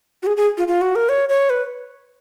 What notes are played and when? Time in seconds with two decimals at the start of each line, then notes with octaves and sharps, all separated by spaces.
0.23 F#4
0.27 G#4
0.37 G#4
0.58 F4
0.68 F4
0.81 F#4
0.95 A#4
1.09 C#5
1.29 C#5
1.50 B4